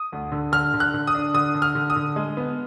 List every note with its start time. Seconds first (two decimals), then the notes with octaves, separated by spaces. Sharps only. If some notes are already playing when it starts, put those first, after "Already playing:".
Already playing: D#6
0.12 D2
0.32 D3
0.52 D3 F6
0.74 D3
0.80 F#6
0.94 D3
1.07 D#6
1.15 D4
1.34 D3 D#6
1.54 D3
1.62 F6
1.75 D3
1.90 D#6
1.96 D3
2.16 G#3
2.37 B3